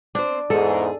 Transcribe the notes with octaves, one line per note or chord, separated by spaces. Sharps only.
C4 D4 C5
E2 G#2 G#4 A4